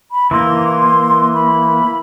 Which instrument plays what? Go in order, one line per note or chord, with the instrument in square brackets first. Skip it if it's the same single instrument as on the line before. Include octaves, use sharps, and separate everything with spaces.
[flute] B5
[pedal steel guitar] E3 A#3 [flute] C6
[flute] B5